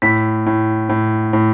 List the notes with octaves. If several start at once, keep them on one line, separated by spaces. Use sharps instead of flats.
A2 B6
A2
A2
A2